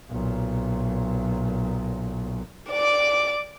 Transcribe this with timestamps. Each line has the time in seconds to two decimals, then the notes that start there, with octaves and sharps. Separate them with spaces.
0.11 B1 A#2
2.70 D5 D6